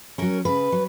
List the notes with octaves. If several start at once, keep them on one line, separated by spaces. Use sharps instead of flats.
F#3 C#4 A#4
C#3 B4
F#3